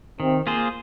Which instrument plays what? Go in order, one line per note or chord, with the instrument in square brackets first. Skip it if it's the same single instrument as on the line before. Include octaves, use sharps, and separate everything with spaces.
[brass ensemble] C3 C4 [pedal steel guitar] D#3
[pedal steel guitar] A#3 F4 G#4 C5